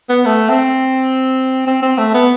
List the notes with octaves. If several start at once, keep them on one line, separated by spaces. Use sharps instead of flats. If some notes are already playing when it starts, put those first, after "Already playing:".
B3
A3
C4
C4
C4
A3
B3